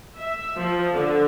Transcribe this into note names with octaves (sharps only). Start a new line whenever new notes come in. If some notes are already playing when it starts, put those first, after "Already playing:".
E5
F3
D3